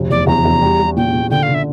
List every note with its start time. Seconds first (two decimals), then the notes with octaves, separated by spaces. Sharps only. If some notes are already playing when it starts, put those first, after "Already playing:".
Already playing: F1 D2
0.10 E2 D5
0.27 E2 A#5
0.45 E2
0.61 G3
0.80 G3
0.97 A#2 G5
1.13 A#2
1.31 D3 G5
1.43 F5
1.49 D3
1.54 E5